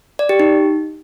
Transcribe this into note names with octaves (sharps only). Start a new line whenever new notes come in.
D5
G4
D#4